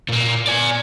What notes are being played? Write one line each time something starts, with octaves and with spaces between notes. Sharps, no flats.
A#2 A#3
D5 G#5